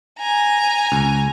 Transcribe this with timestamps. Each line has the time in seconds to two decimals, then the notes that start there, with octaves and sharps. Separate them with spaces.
0.19 G#5 A#5
0.92 C#2